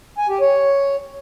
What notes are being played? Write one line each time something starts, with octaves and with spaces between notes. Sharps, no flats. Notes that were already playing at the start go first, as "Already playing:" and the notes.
G#5
G4
C#5